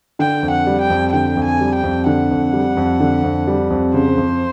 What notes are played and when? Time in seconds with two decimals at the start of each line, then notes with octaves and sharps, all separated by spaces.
0.19 D3 G5
0.43 F2
0.51 F#5
0.67 G3
0.82 G5
0.90 F2
1.13 D3 G5
1.37 F2
1.45 G#5
1.61 G3
1.76 G5
1.84 F2
2.06 D3 F#5
2.31 F2
2.53 G3
2.77 F2
3.00 D3
3.24 F2
3.47 G3
3.70 F2
3.94 C#3 C5
4.18 F2